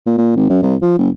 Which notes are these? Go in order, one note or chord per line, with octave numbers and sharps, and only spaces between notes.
A#2
A#2
G#1
F#2
C2
F3
F#1